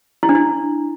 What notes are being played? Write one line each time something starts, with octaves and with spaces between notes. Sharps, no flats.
E4
D4
E4